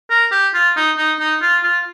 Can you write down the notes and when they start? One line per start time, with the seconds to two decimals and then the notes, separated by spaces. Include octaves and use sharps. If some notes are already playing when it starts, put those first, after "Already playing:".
0.10 A#4
0.32 G4
0.54 F4
0.76 D#4
0.97 D#4
1.20 D#4
1.42 F4
1.64 F4